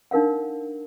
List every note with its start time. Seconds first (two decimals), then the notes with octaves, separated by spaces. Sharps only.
0.11 D4 D#4 A#4 F5 F#5